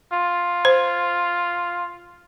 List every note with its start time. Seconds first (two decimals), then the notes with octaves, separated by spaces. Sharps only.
0.13 F4
0.65 C5